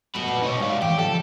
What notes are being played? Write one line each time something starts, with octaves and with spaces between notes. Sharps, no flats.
F#3 A3 F#4 B4
A#2
B2 D#4 C#5
G#2 D5 F5
E3 D4 G4
C#3 F3 A4